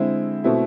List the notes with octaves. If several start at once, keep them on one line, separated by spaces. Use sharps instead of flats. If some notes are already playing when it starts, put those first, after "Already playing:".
Already playing: D3 G#3 C4 E4
B2 A3 C4 E4